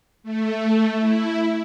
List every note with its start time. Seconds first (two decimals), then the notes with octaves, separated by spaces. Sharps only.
0.23 A3
1.00 E4